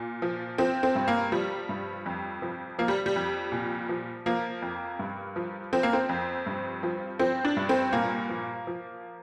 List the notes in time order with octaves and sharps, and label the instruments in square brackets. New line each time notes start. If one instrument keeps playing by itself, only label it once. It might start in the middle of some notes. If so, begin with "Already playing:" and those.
Already playing: [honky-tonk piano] A#2
F3
F3 C4
C4
G2
A#3
F3 G3
G2
F2
F3
F3 A#3
G3
G3
F2
A#2
F3
F3 A#3
F2
G2
F3
F3 C4
A#3
C4
F2
G2
F3
F3 C4
D4
G2
C4
A#2 A#3
F3
F3